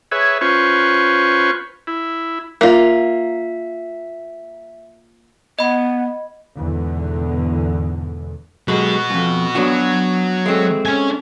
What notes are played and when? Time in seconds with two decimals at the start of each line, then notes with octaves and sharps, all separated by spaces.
0.11 G#4 B4 C#5 E5
0.41 C#4 F4 B4 C5 C#6
1.87 E4
2.61 A#3 F4 E5
5.59 B3 D#5 B5
6.57 E2 G#2 B2 D3
8.68 F#3 G#3 F#4 B4
9.10 F2 G#2
9.55 F#3 B3 D4 F#4
10.46 G#3 A3 C4
10.86 C#4 G#5